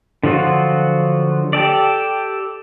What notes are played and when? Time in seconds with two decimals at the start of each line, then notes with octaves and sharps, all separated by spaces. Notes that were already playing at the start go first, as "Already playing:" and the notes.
0.23 D3 F3 F#3 F4 F#4
1.53 G4 A4 D5